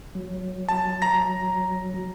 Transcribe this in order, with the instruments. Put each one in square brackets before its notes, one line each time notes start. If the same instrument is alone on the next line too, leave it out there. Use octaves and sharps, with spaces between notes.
[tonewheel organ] F#3
[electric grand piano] A5
A#5 A#6